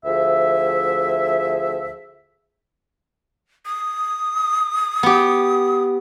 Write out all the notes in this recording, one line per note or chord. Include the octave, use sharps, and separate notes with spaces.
D2 F3 G#4 E5
D#6
B3 G4